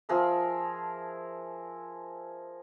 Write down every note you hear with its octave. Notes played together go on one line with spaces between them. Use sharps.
F3 G#4 A#4 E5